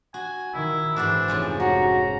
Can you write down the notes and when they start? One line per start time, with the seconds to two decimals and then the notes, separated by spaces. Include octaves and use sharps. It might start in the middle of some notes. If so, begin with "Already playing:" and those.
0.14 F#4 G#5
0.54 D#3 E4
0.96 G#2 E3 D4 F#4 C5 D5
1.28 F1 G#2 F3 C#4
1.60 C#4 F#4 A#5